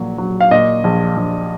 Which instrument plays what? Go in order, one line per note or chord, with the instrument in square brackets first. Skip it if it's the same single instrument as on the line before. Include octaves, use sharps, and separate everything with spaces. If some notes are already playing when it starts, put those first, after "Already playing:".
Already playing: [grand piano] A#1 A#2 F#3
F#3
F5
A#2 D#5
A#1
A#1